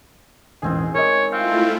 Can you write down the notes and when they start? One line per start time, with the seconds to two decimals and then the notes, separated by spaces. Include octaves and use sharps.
0.62 E1 A1 G#2 C4 G#4
0.95 A#4 C#5 D#5
1.32 A3 C4 E4 F4 F5